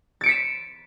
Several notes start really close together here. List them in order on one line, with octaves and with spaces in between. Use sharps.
A6 D7 C#7 B6 E7